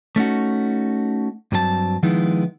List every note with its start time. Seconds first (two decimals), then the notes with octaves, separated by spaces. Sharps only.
0.16 A3 C#4 D#4 F#4
1.52 G2 F#3 C4 G#4 A5
2.03 D#3 F3 G#3 B3 D#4 E4